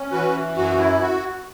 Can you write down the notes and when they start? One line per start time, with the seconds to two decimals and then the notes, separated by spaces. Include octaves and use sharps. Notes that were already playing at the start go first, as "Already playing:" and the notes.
Already playing: C#4
0.12 E3 F#4 B4
0.56 F#2 F#4
0.79 E4
1.01 F#4